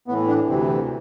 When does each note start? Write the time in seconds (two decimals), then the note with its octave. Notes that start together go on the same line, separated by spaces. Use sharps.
0.08 A2 E3 B3
0.28 D4
0.48 D2 C3 E3 C4
0.68 C4